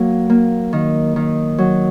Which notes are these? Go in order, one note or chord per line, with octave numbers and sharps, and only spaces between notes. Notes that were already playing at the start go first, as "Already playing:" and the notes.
Already playing: F#3 A#3
A#3
D#3
D#3
F#3